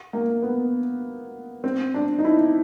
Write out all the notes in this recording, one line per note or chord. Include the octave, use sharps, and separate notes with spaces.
A#3
B3
C4
D4
D#4
E4